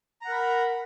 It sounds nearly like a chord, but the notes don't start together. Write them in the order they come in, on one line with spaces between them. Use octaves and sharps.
A#5 F#5 A#4 B5